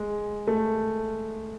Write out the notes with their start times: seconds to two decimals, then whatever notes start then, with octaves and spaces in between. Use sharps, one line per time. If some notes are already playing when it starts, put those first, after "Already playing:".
Already playing: G#3
0.47 A3